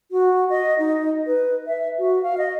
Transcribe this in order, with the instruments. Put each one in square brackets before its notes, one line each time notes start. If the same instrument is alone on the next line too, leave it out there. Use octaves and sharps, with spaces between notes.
[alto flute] F#4
D#5
D#4
B4
E5
F#4
F5
D#5